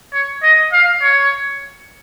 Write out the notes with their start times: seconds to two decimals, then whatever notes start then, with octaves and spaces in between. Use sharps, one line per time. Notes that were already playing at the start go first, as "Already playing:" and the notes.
0.14 C#5
0.43 D#5
0.73 F5
1.02 C#5